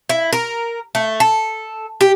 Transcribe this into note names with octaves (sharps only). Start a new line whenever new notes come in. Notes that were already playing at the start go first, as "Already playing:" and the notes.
E4
A#4
A3
A4
G4